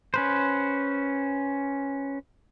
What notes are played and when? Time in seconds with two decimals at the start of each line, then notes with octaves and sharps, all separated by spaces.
0.14 C#4 B4 C5